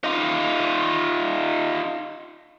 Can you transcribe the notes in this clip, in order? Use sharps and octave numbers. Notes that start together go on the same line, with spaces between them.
D#4 F4